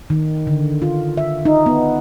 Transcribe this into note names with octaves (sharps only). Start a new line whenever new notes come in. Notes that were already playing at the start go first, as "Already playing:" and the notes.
D#3
D3
F4
E5
D#4
B3